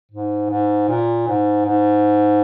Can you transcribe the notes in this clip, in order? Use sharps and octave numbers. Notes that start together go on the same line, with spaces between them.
G#2
G#2
A#2
G#2
G#2